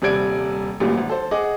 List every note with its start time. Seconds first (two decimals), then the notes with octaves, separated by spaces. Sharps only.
0.02 D#1 C3 G3 D5 G#6 D7
0.80 A1 A#2 F#3 G3
0.98 G#1
1.09 A4 C5
1.31 G#4 D#5 F#5 D6